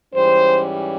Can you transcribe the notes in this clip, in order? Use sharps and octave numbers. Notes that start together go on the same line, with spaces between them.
G#2 E3 G3 C#4 C5